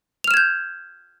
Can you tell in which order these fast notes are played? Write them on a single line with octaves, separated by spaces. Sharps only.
F7 F6 E7 G#6 G6